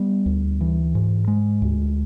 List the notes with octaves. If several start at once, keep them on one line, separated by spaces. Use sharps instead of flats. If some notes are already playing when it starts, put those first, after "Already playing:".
Already playing: G3 B3
D2
E3
G#2
G#3
D2